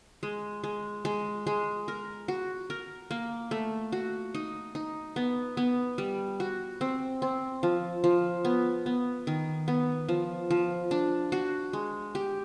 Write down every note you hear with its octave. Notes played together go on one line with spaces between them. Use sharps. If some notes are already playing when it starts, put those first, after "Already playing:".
G#3
G#3
G#3
G#3
A#4
F#4
A#4
A#3
A3
F#4
D#4
D#4
B3
B3
G3
F#4
C4
C4
F3
F3
B3
B3
D#3
B3
F3
F3
D4
F#4
G#3
G4